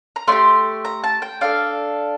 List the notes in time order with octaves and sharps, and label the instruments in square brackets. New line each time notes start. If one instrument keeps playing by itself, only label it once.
[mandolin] A#5
A3 D4 C6
G4
A#5
A5
G5
D4 A4 F5